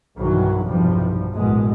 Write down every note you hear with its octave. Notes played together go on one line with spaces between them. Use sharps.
B1 G2 D#3 E3 F#3
B1 E2 G2 C3 F3 G3
A1 F#2 B2 G#3